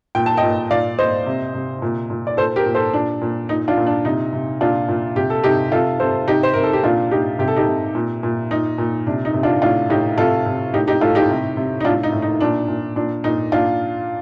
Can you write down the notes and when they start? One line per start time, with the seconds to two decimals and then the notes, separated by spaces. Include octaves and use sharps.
0.15 A#2 G5
0.26 A5
0.37 D#5 G5
0.43 A#2
0.71 A#2 D5 F5
0.98 A#2 C5 D#5
1.26 C3
1.54 C3
1.82 A#2
2.10 A#2
2.27 D5
2.37 A#2 A4 C5
2.56 G4 A#4
2.66 A#2
2.75 A4 C5
2.93 A#2 D4
3.21 A#2
3.49 A#2 D#4
3.68 D4 F4
3.77 A#2
3.86 D4
4.05 C3 D#4
4.33 C3
4.61 A#2 D4 F4
4.88 A#2
5.16 C3 G4
5.30 A4
5.43 C3 D#4 G4
5.72 C3 F4 A4
6.00 C3 A4 C5
6.28 C3 D#4 G4
6.43 C5
6.54 C3 A#4
6.63 A4
6.73 G4
6.83 A#2 D4 F4
7.11 A#2 D#4 G4
7.39 C3 G4
7.48 A4
7.56 D#4 G4
7.67 C3
7.95 A#2
8.23 A#2
8.51 A#2 D#4
8.78 A#2
9.07 C3 D4
9.25 D#4
9.34 C3
9.43 D4 F4
9.62 A2 D4 F4
9.90 A2 D#4 G4
10.18 C3 F4 A4
10.46 C3
10.73 A2 D#4 G4
10.87 D#4 G4
11.01 A2 F4 A4
11.15 D#4 G4
11.29 C3
11.57 C3
11.80 D#4
11.84 A2 D4 F4
12.03 D#4
12.12 A2
12.22 D#4
12.41 A#2 D4
12.68 A#2
12.96 A#2 D4
13.24 A#2 D#4
13.52 A#2 D4 F4